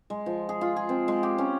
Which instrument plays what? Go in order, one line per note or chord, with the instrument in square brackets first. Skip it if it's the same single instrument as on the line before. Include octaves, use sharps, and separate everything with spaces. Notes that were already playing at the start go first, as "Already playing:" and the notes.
[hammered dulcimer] G#3
F3
G#4
F4
G#4
C4
G#3
G4
C#4